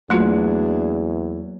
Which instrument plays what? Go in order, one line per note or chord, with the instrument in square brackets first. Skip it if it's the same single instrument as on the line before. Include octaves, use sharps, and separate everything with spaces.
[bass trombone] E2 [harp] F#3 A#3 F#4 [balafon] A3 F4 [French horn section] D4 G#4